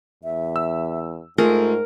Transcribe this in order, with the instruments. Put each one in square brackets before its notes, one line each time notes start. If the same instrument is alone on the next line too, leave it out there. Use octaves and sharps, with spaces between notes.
[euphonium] E2 [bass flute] E5
[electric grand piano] E6
[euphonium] G#2 [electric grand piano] A3 G#4 [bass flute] F4 [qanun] A#4